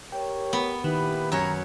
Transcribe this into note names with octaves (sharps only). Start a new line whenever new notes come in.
G4 A#4 C#5 G5
B3
A#2 D#3 E4 G4 B4
F#2 C#5 A#5